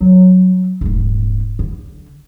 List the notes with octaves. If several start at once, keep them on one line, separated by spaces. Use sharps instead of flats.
F#3 G3
D#1 G#2
D3